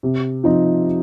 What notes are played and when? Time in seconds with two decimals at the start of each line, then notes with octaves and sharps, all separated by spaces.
0.03 C3
0.44 F3 C4 D#4